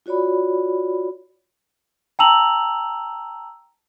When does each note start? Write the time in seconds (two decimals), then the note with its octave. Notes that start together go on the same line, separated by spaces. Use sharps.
0.06 F4 F#4 C#5 D5 B5
2.19 G5 A5 A#5 E6 F7 F#7